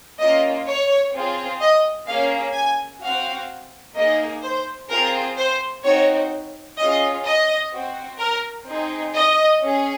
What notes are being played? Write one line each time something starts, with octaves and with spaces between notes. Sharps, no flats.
A#3 C#4 F4 D#5
C#5
C4 F4 G#4
D#5
A#3 C#4 G#4 F5
G#5
C4 F#4 F5
A#3 D#4 G#4 D#5
C5
C4 F4 G#4 A#4
C5
C4 D#4 F#4 C#5
C#4 F4 G#4 D#5
D#5
C4 F#4
A#4
C4 D#4 G#4
D#5
C#4 G#4